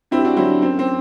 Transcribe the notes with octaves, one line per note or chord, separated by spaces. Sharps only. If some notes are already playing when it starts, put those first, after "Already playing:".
G2 C4 E4
G4
D4 F#4
D3 F#3 C4 E4
D4
F#2 C4
C4